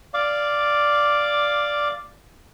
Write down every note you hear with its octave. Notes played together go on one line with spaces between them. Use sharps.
D5 F5 D6